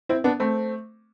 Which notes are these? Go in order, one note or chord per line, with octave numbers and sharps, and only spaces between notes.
C4 E4
B3 D4
A3 C4